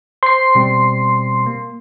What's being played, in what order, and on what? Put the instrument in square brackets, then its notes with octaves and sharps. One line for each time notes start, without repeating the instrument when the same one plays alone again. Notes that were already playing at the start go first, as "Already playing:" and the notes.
[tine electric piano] C5 [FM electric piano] C6 C7
[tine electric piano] B2 G3 C4
A#3